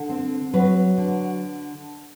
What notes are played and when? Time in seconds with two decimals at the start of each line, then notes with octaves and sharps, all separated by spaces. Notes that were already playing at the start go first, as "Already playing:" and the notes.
Already playing: D3 A4
0.09 C4
0.53 F#3 B4
0.98 D3